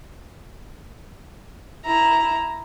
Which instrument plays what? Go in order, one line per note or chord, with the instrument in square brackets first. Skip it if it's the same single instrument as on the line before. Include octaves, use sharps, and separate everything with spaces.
[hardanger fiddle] E4 A#5